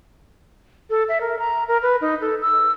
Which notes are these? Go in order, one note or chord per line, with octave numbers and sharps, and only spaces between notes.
A4
E5
A#4
A#5
A#4
B4
D#4
A4
E6